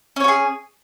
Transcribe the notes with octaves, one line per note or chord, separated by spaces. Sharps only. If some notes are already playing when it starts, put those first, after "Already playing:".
C#4 F#4 G#4 C#5